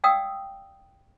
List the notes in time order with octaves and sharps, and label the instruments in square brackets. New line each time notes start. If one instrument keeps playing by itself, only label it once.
[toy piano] D5 F5 G5 D#6 E6